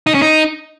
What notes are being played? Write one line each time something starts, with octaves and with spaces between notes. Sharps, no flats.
D#4
C#4
D#4